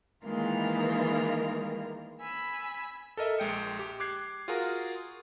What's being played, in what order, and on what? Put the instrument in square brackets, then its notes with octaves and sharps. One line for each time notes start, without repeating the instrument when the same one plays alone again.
[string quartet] D#3 E3 G#3 A#3 F4 A#4
G#5 B5 E6
[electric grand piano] A4 A#4 D#5 E5
A#1 G#3 G5 C#7
G4
D6 F#6 G#6 C7
F4 F#4 G#4 A#4